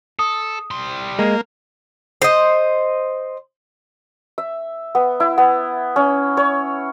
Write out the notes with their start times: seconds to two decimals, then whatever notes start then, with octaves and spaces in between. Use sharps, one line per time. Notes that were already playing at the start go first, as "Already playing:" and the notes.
0.19 A4 D#6
0.71 G3 C6
1.19 G#3 A#3
2.22 C5 D#5
4.38 E5
4.95 B3
5.20 E4
5.38 B3
5.96 C#4
6.37 C#5